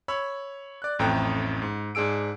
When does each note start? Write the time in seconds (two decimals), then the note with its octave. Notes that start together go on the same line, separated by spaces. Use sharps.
0.08 C#5 B5 E6
0.82 D5 F#6
0.99 A1 F2 A2 G5 A#5
1.62 G#2
1.95 G#2 D4 G#4 E6 D7